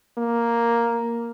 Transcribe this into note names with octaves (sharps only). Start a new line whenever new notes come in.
A#3